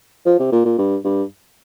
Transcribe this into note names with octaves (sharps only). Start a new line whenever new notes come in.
F3
C3
A#2
A#2
G2
G2